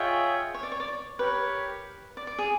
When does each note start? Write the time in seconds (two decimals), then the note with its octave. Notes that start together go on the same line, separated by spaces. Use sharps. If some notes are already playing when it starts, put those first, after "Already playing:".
Already playing: F4 G#4 C#5 D#5 E5 G5
0.54 C#5
0.63 D5
0.72 C#5
0.80 D5
0.88 C#5
1.19 G4 A#4 B4 C#5
2.17 D5
2.27 D5
2.39 G#4